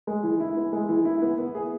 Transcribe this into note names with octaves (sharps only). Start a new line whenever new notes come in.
G#3
E3
E4
B3
G#3
E3
E4
B3
B3
G#4